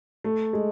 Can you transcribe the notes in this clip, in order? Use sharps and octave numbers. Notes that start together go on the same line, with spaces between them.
A3
G#3